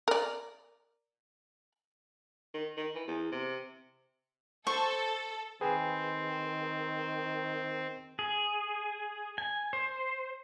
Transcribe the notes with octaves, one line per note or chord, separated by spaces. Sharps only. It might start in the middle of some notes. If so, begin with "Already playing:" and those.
A#4 D5
D#3
D#3
E3
E2
C3
A4 C5 C#6
D#3 C4 G#4 B4 G5
G#4
G#5
C5